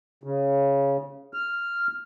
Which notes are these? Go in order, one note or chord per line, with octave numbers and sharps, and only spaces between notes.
C#3
F6